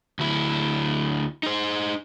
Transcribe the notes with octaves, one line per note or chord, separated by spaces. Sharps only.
D2 E4
D#4 C5